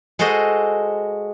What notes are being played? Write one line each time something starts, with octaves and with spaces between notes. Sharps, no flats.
G#3 F#4 A4 C5 D#5